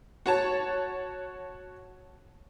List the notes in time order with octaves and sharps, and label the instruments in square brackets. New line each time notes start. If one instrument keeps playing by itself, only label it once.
[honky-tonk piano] F#4 C#5 A5